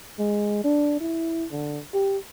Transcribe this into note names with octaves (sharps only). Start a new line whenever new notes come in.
G#3
D4
E4
D3
G4